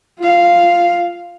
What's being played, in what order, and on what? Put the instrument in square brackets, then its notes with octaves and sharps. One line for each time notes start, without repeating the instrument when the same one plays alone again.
[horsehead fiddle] F4 F5